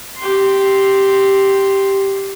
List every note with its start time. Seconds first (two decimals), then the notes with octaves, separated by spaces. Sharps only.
0.17 G4 C6